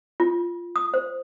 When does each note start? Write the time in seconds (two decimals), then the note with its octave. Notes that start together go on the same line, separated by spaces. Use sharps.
0.20 F4
0.76 D#6
0.94 C5